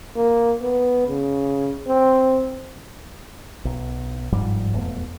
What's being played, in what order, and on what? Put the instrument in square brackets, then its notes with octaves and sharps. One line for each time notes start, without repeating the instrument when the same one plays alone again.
[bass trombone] A#3
B3
C#3
C4
[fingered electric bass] B1
G1 G#2 F3 G3
E1 F2 A3 B3